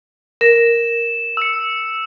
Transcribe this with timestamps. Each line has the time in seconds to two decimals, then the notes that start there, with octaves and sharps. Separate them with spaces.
0.41 A#4 A#6 E7
1.37 E6 C#7